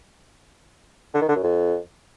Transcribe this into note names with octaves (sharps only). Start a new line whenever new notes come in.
D3
D#3
D3
F#2
F2